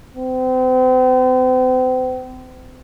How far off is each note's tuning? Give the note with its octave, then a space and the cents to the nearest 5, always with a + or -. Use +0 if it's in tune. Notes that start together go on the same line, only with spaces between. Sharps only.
C4 -40